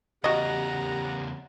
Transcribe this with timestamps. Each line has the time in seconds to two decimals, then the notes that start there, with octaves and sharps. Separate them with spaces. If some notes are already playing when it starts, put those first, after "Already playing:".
0.24 E2 C#3 F#4 G4 D#5 F#5 A#5